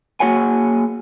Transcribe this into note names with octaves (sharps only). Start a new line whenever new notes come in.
A#3 F#4 G#4 C#5 F#5 G#5